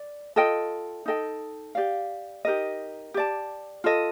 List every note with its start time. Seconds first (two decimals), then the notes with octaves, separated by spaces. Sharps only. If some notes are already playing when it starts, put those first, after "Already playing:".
Already playing: D5
0.36 F4 A4 D#5 G5
1.06 D#4 A4 D#5 G5
1.75 G4 D5 F5
2.45 D#4 G4 A#4 D#5
3.14 G4 D5 A5
3.84 F4 A4 D#5